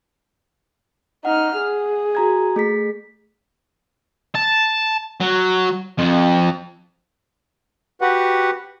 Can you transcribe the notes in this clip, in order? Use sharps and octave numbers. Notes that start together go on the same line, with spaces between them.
D#4 F#5 F6
G#4
F#4 A#5 G#6
A3 G#4 B6
A5
F#3
F2
F#4 G4 B4 F#5